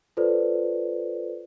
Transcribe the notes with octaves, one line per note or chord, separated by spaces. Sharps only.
F4 A4 B4 C5 D5